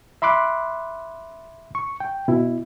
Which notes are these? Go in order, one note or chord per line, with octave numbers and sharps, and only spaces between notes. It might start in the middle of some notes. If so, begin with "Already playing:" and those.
E5 B5 C6 D6 F#6
C#6
G5
B2 E4